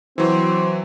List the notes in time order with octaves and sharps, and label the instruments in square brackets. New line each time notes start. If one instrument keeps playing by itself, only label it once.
[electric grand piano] E3 F#3 [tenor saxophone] C4